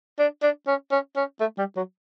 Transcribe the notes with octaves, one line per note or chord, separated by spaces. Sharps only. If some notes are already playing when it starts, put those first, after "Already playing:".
D4
D4
C#4
C#4
C#4
A3
G3
F#3